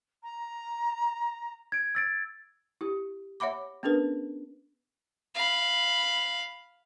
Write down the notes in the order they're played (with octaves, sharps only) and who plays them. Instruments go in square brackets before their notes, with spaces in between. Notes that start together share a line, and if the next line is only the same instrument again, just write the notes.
[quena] A#5
[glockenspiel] G#6 D7
E6 A6 D7
[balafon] E4 G4
C#5 E5 F#5 B5 D6
B3 C#4 D4 G#4 A#4 B4
[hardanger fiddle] F5 B5